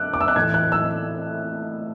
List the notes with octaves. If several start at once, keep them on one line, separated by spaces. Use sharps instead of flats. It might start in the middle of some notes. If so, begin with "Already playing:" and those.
Already playing: D3 D6 E6 F#6
D6
E6
F#6
A2 E3 A3 G#6
F#6
E6